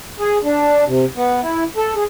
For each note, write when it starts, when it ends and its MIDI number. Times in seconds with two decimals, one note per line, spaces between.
0.19 0.38 68
0.44 0.84 62
0.86 1.05 48
1.16 1.41 59
1.42 1.64 64
1.77 1.94 69
1.95 2.04 68